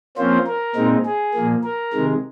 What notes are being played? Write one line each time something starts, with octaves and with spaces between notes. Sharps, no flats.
F3 A#3 C4 C#4 F4 C5
A#4
A#2 G#3 C4 D#4
G#4
A#2 F3 A#3
A#4
C3 D#3 G#3